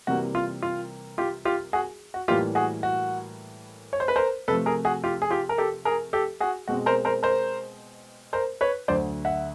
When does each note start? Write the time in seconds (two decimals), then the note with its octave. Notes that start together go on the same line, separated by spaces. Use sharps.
0.07 C3 E3 G3 A#3 F#4
0.35 F4
0.62 F4
1.18 F4 G4
1.45 F4 G4
1.73 F#4 G#4
2.14 F#4
2.28 A2 E3 G3 A#3 F4 G4
2.55 F#4 G#4
2.83 F#4
3.93 C#5
4.00 C5
4.08 B4
4.16 A#4 C5
4.48 C3 F3 A3 A4 B4
4.66 G#4 A#4
4.85 F#4 G#4
5.04 F4 G4
5.22 G#4
5.30 F4 G4
5.49 A#4
5.58 G4 A4
5.85 G#4 A#4
6.13 G4 A4
6.40 F#4 G#4
6.68 B2 G#3 C4 F#4
6.86 A#4 C5
7.05 A#4 C5
7.23 A#4 C5
8.33 A#4 C5
8.61 B4 C#5
8.88 D2 D3 F#3 C5 D5
9.25 E5 F#5